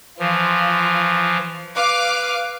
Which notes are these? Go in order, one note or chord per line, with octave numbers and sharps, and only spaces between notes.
E3 F3 F4
B4 F5 D6